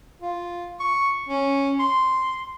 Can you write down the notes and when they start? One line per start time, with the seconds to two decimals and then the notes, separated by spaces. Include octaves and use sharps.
0.22 F4
0.80 C#6
1.29 C#4
1.79 C6